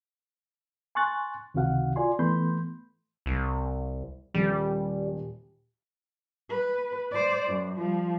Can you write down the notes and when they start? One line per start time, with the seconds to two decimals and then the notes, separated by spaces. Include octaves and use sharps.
0.95 G#5 C6 C#6 F#6 A6
1.54 C#2 C3 D#3 F#4 F5 F#5
1.96 F4 D5 G#5 C6
2.19 E3 A3 B3 B5 C6 G6
3.26 C2
4.34 D#1 G3
6.50 B4
7.11 C5 D5
7.48 F#2
7.76 F3 G3